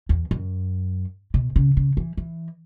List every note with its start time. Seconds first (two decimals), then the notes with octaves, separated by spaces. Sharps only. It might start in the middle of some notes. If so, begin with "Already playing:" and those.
0.09 E2
0.31 F#2
1.34 B2
1.56 C#3
1.77 C#3
1.97 E3
2.17 E3